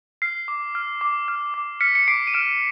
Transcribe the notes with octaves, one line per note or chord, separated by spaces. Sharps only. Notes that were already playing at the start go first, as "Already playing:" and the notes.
F6 C7
D6
F6
D6
F6
D6
F6 B6 C#7
C#7
D6 C7 D7
D#7
F6 D7 E7